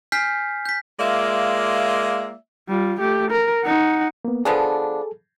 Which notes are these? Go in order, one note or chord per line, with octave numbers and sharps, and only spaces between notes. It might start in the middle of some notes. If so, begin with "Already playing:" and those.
G#5 F6 G6 B6 C7
G6 B6
G#3 A#3 F4 D5 E5
G3 F4
A3 G4
A#4
D#4 F#5
A#3 B3
F3 B3 D4 G#4 A4